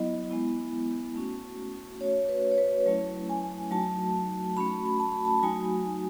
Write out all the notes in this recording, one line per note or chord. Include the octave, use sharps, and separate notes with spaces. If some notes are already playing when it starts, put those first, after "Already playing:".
Already playing: F#3 B3 E4 D#5
G#3 B3 E4
A3 C#4 F#4
A3 C#4 F#4 C#5
B4
C#5
B4
F#3 A3 C#4 E4
G#5
F#3 A3 D#4 F#4 A5
A3 C#4 F#4 B5
A5
B5
A5
F#3 A3 D#4 F#4 G#5